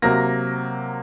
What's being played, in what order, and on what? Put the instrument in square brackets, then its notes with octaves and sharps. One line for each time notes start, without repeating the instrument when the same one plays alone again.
[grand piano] C3 F#3 A#3 A#6